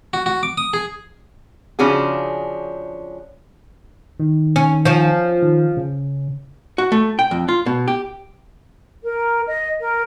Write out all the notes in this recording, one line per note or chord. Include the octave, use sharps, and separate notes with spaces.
F#4
F#4
D6
D#6
G#4
C#3 F3 C#4 D4 F#4 G#4
D#3
C#4
F3 C#4
D#3
C#3
F#4
A3
G5
F2
F4
B2
G4
A#4
D#5
A#4